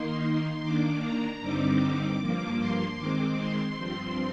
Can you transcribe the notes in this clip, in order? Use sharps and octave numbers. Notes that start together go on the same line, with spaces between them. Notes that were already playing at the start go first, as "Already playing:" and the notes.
Already playing: D#3 A#3 D#4 C6
D#3 A#3 D4 D6
A#5
G2 D3 G3 C4 D#4 D6
G2 F3 A#3
C6
D#3 G#3 C4 D6
C6
G2 F3 C4